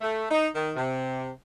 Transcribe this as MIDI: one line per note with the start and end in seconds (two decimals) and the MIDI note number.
0.01 0.25 57
0.30 0.47 63
0.54 0.71 51
0.76 1.29 48